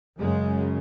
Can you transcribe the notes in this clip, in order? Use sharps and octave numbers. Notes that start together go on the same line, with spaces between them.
F#2 C#3 G#3